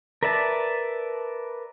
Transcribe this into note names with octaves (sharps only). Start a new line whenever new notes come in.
A#4 B4 D5 E5 A5